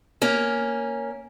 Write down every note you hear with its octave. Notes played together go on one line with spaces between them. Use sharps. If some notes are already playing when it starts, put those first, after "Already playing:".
A#3 C#4